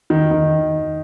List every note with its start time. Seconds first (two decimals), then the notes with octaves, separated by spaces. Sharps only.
0.10 D#3
0.31 D#3